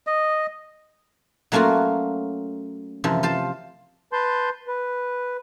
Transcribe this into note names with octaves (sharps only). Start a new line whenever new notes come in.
D#5
F#3 A3 A#3 C#4 F4 F#4
F#2 C3 E3 F3
F4 C5 A5
B4 A5 C6 G6
B4